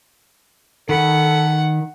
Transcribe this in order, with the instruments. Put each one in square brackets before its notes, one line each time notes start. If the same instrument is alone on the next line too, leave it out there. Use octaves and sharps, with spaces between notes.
[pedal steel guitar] D#3 B5 [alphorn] A4 [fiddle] F#5